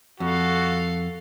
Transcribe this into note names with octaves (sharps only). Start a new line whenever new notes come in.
F2 F#4 A4 F5